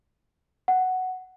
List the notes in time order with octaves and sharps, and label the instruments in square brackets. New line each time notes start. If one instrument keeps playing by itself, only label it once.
[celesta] F#5